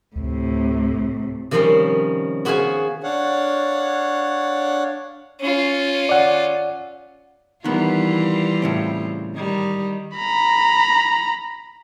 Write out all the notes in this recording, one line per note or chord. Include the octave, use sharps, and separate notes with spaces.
D2 A2 C3
C3 D#3 F3 G3 C#4 C6
B3 F#4 G#4 C5 F5 G#5
D4 C#5 F5 F#5
C#4 F4
D5 F#5
D#3 E3 G3 B3 F4
A2 C#3 C4
D#3 G3
A#5 B5